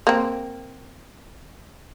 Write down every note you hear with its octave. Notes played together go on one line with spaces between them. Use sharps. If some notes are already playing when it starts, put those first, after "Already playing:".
A#3 C4